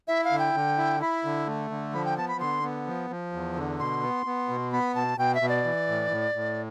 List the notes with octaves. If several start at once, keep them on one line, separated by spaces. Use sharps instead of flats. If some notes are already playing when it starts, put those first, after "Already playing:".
E4 E5
F5
D3
G5
D3
E4
E4 B5
D3
A3
D3
F3 B5
G5
B3 A5
B5
D3 C6
B3
F3
F3
E2
D3
B2 C6
B3
B3
B2
B3 B5
B2 A5
B2 G5
E5
B2
D5
E3
A2
A2
A2